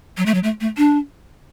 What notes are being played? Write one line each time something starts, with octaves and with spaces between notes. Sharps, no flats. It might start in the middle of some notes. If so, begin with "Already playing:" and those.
F#3
A3
F#3
A3
A3
D4